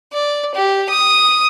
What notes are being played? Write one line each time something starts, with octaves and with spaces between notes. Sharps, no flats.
D5
G4
D#6